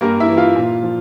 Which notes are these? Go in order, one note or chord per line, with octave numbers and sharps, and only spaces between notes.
G2 A#3 A#4
E4 E5
E3
F4 F5
A#2
F3